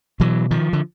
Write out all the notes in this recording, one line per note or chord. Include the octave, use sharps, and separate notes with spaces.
B2 E3 F#3
D#3 F3
D3